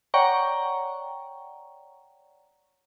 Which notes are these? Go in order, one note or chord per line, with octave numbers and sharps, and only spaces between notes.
C#5 D5 F#5 G5 A#5 C#6